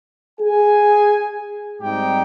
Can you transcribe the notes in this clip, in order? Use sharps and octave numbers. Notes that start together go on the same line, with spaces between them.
G#4 G#5
G#2 G3 C4 D#4 G4 G5